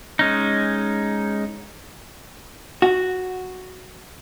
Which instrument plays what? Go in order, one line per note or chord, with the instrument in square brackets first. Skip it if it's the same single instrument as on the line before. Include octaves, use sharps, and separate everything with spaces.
[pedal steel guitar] G#3 C#4 D#4
[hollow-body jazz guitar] F#4